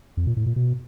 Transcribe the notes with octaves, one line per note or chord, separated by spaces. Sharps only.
F2
A#2
A2
A#2
B2